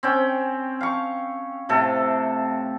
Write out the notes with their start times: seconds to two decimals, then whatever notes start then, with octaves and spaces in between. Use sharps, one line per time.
0.03 C4 C#4 G5
0.81 F5 C#6
1.69 A2 C3 A4